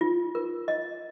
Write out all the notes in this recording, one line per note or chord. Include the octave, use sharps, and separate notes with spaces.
F4
A#4
D#5